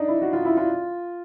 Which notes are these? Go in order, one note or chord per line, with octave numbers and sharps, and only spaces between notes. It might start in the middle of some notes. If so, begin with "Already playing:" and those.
Already playing: D4 D#4
E4
F#4
F4
E4
F4